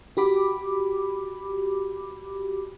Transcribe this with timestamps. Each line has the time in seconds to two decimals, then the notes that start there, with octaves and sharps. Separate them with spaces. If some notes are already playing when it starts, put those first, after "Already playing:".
0.17 F#4 G4 B5 D6